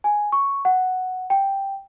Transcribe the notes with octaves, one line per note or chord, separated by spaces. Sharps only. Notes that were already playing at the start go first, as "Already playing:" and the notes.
G#5
C#6
F#5
G5